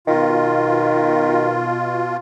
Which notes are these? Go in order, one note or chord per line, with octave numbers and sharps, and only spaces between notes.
B2 D#3 F4